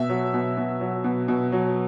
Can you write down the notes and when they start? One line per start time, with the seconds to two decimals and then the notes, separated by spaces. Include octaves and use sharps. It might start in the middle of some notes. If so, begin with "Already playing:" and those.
Already playing: B2 E5
0.09 F#3
0.34 B2
0.57 B2
0.81 F#3
1.04 B2
1.28 B2
1.52 F#3